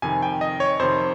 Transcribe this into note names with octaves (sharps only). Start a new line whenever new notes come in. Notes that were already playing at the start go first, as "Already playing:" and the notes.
F2 C3 D#3 G#5
G5
D#5
C#5
F2 C3 D#3 C5